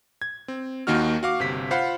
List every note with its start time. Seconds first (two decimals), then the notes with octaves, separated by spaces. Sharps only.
0.22 G#6
0.48 C4
0.87 D#2 D#3 A#3 D#4 F#4 F6
1.23 F#4 F5 D6
1.40 G1 C3 B6
1.71 F4 C5 F5 F#5 B5